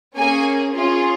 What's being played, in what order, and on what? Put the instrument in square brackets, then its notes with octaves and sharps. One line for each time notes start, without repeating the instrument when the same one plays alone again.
[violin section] A#3 C#4 G#4 G#5
C#4 F4 G#4